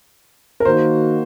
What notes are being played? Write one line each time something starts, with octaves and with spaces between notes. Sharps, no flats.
A#4
D#3 A#3 D#4 F#4 C5